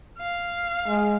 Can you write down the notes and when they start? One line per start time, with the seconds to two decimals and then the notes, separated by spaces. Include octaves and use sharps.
0.18 F5
0.88 G#3